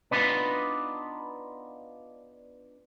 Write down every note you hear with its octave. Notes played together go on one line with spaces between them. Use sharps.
B3 D4 D#4 F4 B4